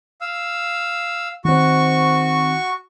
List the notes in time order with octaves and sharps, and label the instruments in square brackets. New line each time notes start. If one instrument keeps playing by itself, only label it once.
[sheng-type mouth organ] F5 E6
[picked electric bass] D#3 C4 [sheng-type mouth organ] F#4 C#6